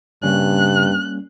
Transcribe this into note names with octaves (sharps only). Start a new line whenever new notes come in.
G2 C#3 G3 A#3 C#4 F#6